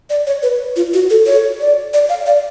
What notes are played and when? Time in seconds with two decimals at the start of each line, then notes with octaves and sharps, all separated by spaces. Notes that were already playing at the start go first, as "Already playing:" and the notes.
0.10 D5
0.27 C#5
0.43 B4
0.76 F4
0.94 F#4
1.10 A4
1.26 C#5
1.60 D5
1.94 D5
2.09 F5
2.26 D5